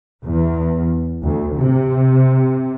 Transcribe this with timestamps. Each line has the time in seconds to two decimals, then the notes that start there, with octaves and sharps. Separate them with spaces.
0.23 E2
1.22 D2
1.59 C3